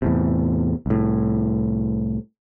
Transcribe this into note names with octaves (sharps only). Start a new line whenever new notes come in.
E2 A2 C3
C2 A2